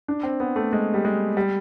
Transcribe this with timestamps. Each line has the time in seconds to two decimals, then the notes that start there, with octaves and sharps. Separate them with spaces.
0.08 D4
0.23 C4
0.40 B3
0.56 A3
0.73 G#3
0.94 G3
1.05 G#3
1.37 G3